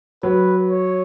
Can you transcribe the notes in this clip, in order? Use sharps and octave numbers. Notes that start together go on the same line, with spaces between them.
F#3 B4
C#5